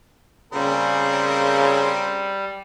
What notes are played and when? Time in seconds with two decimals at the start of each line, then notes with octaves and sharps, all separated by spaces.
0.53 A#2 C#3 G3 C4 A#4